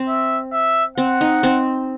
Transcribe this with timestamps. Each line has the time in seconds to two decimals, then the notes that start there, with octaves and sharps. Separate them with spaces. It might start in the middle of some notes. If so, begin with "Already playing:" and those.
Already playing: C4
0.09 E5
0.53 E5
0.98 C4 F#5
1.21 D#4
1.43 C4